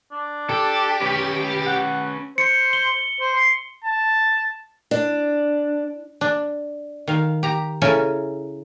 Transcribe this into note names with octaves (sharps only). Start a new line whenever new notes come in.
D4
G4 A4
C#4 B4
F#5
C5 C#7
G7
C5
C6
A5
D4
D4
D#3 F5
G4 A#5
C#3 C#4 E4 A4 A#4 G#5